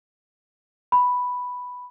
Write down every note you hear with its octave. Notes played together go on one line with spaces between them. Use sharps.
B5